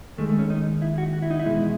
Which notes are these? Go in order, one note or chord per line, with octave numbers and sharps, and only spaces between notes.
D#2 D#3 G#3 A3
A3
C#4
D#4
E4
F#4
F#4
E4
D#4
E4
E2 B2 G#3